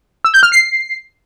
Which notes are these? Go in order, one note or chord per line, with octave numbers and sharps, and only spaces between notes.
E6
G6
F6
C7